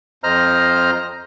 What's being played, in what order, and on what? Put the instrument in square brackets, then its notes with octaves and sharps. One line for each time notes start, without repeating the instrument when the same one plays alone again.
[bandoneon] F2 C5 D#5 A#5 F6